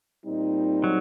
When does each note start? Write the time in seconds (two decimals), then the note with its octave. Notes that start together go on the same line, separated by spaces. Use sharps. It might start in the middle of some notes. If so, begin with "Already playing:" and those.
0.25 A#2 G3 C4 D#4
0.84 F#3